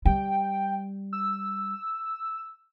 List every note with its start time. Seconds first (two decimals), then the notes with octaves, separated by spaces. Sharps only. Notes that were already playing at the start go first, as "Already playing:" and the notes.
0.05 G3 G5
1.13 E6